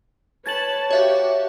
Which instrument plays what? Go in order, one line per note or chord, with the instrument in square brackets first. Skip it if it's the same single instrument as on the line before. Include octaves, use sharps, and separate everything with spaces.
[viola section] B4 C#5 A5 [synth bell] G#6 A6 F#7
[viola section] F#4 G4 [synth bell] C#5 E5 F5